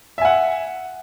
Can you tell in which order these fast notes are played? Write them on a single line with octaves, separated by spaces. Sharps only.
E5 G#5 F#5